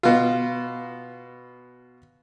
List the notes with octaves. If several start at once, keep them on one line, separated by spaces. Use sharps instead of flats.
B2 F4